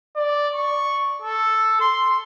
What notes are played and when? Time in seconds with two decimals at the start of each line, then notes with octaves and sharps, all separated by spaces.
0.17 D5
0.55 C#6
1.22 A4
1.81 C6